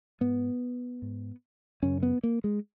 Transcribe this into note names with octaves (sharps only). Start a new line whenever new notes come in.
G#2 B3
G#2
F#2 C#3 C#4
B3
A#3
G#3